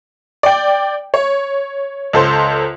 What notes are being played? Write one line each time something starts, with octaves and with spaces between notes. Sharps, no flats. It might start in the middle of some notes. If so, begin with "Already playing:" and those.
D5 G5
C#5
C#2 A4 C5 C6